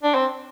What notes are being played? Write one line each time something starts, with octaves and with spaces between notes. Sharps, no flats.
D4
C4